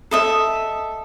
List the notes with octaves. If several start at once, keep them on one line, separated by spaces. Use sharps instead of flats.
A4 D#5 E5